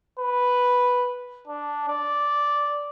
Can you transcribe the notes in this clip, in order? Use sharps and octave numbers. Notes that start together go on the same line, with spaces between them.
B4
D4
D5